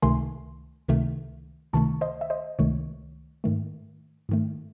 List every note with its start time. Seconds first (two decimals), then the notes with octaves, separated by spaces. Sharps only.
0.02 C#2 C3 D#3 A3 G#5 C6
0.88 C#2 C3 D#3 A3
1.73 C#2 C3 D#3 A3 A5 C#6
2.01 C5 D#5
2.21 E5
2.30 C5 D#5
2.59 C#2 C3 D#3 A3 C#5
3.44 G#2 D#3 A3
4.29 G#2 D#3 A3